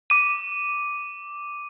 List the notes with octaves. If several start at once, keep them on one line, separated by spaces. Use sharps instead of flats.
D6 D#7